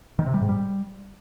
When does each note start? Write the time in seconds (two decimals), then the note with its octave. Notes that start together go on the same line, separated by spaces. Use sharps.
0.19 D#3
0.26 C3
0.34 G3
0.41 G#2
0.49 G3